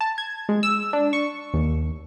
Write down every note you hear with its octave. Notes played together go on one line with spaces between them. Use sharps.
A5
G#6
G#3
E6
D4
C#6
D#2